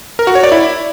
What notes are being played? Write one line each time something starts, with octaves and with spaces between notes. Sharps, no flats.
A#4
F#4
C#5
D5
E4